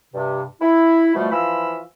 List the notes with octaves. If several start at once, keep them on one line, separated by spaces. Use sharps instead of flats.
G2 C3
E4
B2 E3 F3 G3 A3
E3 F3 F4 B5 E6